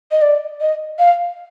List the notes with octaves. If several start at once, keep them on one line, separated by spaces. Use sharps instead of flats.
D#5
D5
D#5
F5